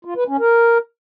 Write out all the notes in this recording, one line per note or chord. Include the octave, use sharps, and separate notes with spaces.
F4
B4
C#4
A#4